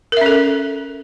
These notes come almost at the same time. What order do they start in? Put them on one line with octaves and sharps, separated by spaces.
A#4 E5 C#4 A4